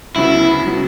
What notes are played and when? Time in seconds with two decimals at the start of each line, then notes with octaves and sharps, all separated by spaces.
0.16 D2 C#3 F#3 B3 E4 F#4
0.66 C#3 F#3 B3 F#4